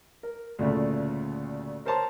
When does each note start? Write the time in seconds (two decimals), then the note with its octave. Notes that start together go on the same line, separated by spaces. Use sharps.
0.23 A#4
0.59 D2 A#2 C#3 A3
1.86 A#4 C5 C#5 A5 A#5 C6